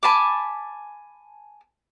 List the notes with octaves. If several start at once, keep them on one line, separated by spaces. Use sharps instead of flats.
G#5 A5 B5 D6